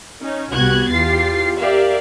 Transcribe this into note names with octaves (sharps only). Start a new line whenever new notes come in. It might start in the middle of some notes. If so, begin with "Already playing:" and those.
C#4 D#4
C2 B3 F#4 G4 F#6 G#6
E2 F4 G4 A6 C7
G4 A#4 D5 E5 F5